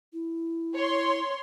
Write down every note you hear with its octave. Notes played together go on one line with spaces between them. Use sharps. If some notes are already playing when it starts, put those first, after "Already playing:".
E4
C#5 C6